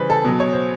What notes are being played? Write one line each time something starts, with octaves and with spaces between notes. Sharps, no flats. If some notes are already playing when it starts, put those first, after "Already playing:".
Already playing: C#3 E3 G3 B4 C5
A4
B2 F#3
C#5
C5